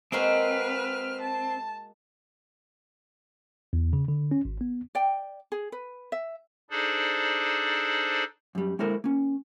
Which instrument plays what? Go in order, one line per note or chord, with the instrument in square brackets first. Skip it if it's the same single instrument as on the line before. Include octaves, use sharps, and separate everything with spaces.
[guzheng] G#3 A#3 F#4 [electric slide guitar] C4 [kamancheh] B4 F6
[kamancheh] A5
[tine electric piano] E2
C#3
D3
C#4
G#1
B3
[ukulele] D5 G5
G#4
B4
E5
[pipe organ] D4 D#4 G#4 A4 C5 D5
[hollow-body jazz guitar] F#2 G3
G#3 A#3 E4 A4 A#4 C5
A#3 C#4